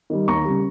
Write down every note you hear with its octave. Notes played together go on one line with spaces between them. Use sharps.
D#3 G3
D#2 A#5 C#6
G3
C#3